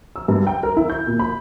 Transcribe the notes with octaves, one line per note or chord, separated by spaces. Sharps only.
E6
G2
G5
A#4
E4
G6
A#2
B5